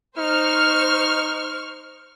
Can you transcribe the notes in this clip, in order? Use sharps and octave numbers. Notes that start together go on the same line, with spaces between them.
D#4 C5 C#6 F6